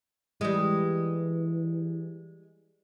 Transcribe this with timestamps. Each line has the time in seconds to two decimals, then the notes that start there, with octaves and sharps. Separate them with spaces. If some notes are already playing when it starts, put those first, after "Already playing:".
0.41 E3 G3 G#3